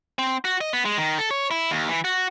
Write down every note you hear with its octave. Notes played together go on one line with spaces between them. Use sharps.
C4
F#4
D#5
B3
G#3
D#3
A4
C#5
E4
D#2
E3
F#4